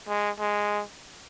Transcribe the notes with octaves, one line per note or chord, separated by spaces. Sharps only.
G#3
G#3